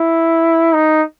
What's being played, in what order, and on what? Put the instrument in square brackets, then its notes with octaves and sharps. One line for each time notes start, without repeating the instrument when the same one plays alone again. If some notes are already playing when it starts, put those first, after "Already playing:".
Already playing: [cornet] E4
D#4